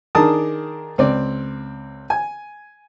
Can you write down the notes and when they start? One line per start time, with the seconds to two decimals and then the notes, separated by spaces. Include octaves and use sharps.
0.15 D#3 D4 G#4 A#4 A5 D#6
0.98 C#2 C4 D5
2.10 G#5